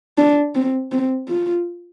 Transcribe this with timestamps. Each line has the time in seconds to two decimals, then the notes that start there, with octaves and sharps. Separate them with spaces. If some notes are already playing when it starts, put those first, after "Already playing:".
0.18 D4
0.55 C4
0.92 C4
1.28 F4